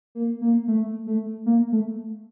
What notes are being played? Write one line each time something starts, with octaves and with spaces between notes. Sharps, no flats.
A#3
A#3
A3
A3
A#3
A3